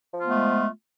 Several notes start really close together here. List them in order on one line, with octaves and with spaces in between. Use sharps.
F3 F4 B3 A3 G#3